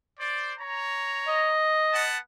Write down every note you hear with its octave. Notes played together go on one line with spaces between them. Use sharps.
C5 D5
C#5 A#5
D#5
B3 F#5 A5